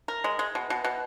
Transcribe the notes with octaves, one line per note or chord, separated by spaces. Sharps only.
A#4
G#3
G#3
B2
B2
B2